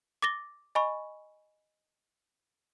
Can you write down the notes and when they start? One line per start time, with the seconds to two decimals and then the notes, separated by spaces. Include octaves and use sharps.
0.22 D6 A6 A#6 G7
0.75 D#5 G#5 B5 C#6